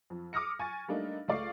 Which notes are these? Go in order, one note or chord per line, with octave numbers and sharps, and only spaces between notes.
F2
D6 D#6 F6 A#6 C#7
G#5 C#6 A6
G3 A3 A#3 D4 D#4
C#2 A3 D5 F5 C#6 C7